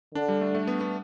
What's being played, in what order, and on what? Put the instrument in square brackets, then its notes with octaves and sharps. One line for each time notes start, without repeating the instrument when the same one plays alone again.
[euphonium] D3 [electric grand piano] D4
[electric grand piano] G3
A3
A3
B3
B3